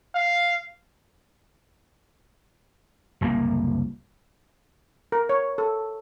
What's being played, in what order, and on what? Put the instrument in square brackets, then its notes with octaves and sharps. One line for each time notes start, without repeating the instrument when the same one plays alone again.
[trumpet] F5
[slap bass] F#1 C2 A2 A#3
[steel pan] A#4
C#5
A4